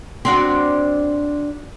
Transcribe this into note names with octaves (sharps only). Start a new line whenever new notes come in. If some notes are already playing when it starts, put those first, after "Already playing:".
C4 D4 F#4